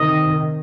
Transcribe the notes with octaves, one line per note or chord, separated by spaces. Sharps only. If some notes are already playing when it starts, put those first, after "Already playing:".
Already playing: C3 D#3 D#5